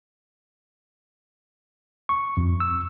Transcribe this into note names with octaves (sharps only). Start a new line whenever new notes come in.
C#6
F2
E6